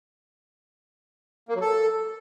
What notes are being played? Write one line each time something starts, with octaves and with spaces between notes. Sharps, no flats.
A#3
F#3
A4